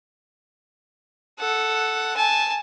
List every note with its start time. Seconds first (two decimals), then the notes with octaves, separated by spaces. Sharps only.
1.39 A4 F#5
2.17 G#5 A5